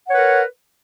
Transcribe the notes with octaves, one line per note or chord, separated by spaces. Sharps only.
A#4 B4 C#5 F#5